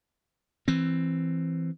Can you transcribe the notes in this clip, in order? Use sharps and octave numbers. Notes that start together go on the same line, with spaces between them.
E3 C4